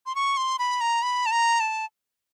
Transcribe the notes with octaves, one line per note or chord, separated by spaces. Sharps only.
C6
C#6
C6
B5
A#5
B5
A5
A#5
A5